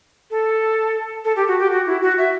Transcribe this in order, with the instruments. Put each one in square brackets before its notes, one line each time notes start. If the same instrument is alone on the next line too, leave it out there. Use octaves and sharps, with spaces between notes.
[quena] A4
A4
G4
F#4
G4
F#4
E4
F#4
E5